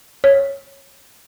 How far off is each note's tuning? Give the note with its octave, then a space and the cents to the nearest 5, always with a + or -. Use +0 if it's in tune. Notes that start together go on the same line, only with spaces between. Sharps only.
C#5 -10